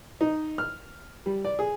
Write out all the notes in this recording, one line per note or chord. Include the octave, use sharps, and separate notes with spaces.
D#4
F6
G3
D5
G#4